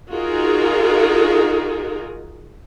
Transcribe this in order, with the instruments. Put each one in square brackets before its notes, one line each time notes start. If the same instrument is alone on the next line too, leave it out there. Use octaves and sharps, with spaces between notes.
[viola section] D#4 F4 F#4 G#4 A#4